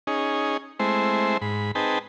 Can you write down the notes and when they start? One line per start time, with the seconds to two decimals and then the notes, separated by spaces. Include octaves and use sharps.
0.07 C#4 D#4 G#4
0.79 G#3 A3 C4 E4 C5
1.42 G#2 B5
1.75 C4 D#4 G#4 B4 G5 A5